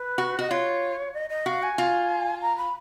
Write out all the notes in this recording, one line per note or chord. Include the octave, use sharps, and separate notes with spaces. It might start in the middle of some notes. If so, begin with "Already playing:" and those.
Already playing: B4
F#4
F#4 D#5
F4 C#5
D#5
D#5
F#4 F5
G#5
F4
A#5
B5